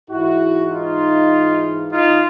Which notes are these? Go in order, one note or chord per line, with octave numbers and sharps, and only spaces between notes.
G#2 E3 E4 F#4
D#4 F4
D#4 F4